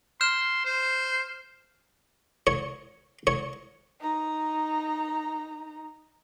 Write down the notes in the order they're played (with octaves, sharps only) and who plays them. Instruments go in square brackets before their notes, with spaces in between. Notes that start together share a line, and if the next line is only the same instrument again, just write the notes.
[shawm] C6 [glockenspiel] F6 G6 E7
[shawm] C5
[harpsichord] C#5
C#5
[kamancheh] D#4 A#5